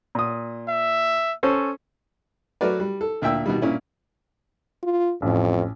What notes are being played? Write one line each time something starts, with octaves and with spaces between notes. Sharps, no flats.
A#2 D#6
E5
C#4 A4 C5
F#3 A3 F#4 A#4 B4 D5
G3
A4
D2 A#2 E5 G5 E6
B2 D#3 G3
G2 A#2 C#4 E4
F4
A1 F2